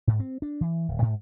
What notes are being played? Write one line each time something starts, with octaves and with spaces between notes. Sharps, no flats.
G#2
C4
D4
E3
D1
G#2